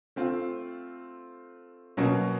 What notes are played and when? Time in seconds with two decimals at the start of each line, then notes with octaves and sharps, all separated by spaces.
0.16 A3 C4 F4
1.97 B2 F#3 A#3 C#4